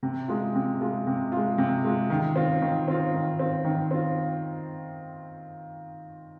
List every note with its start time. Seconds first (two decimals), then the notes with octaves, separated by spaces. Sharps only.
0.03 C3
0.28 G#3 F4
0.55 C3
0.81 G#3 F4
1.07 C3
1.32 G#3 F4
1.58 C3
1.85 G#3 F4
2.10 D#3
2.36 C4 F4
2.62 D#3
2.88 C4 F4
3.14 D#3
3.39 C4 F4
3.65 D#3
3.91 C4 F4